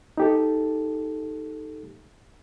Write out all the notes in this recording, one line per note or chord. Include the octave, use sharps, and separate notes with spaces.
D#4 G4 A4